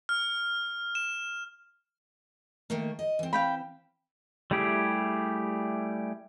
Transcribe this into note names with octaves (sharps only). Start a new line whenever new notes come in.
F6
E7
D#3 A3 A#3
D#5
E3 C4
F5 G5 B5
G3 A3 E4 G4 G#4